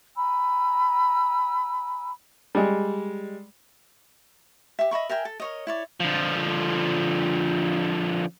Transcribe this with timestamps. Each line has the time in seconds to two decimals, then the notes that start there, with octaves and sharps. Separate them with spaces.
0.16 G#5 A#5 B5 E6
2.55 G3 G#3
4.79 G4 E5
4.91 D#5 E5 B5 C#6
5.09 A#4 E5 G5 G#5
5.25 A4
5.40 A#4 C#5 D#5
5.67 E4 C#5 D5
6.00 D3 F3